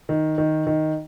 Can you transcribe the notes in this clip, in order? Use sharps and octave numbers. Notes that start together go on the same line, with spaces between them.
D#3
D#3
D#3